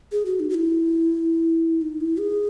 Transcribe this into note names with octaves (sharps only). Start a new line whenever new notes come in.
G#4
F#4
D#4
F#4
E4
D#4
E4
G#4